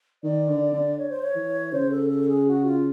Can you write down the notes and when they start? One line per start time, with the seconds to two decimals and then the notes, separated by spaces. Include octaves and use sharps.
0.24 D#3 D5
0.49 D3
0.73 D3
0.98 C#5
1.10 C5
1.23 C#5
1.35 E3
1.73 C#3 C5
1.91 A4
2.10 A4
2.29 G#4
2.48 F#4
2.66 F4